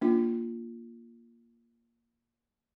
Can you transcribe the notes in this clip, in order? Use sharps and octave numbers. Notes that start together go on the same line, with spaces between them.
A#3 D4 F4